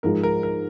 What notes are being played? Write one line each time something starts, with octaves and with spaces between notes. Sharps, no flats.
G#2 F3 G#3 A#4
A#4
A#4